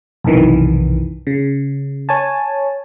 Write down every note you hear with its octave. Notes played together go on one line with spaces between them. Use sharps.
B1 F#2 C3 D#3 E3
C#3
C#5 G#5 A5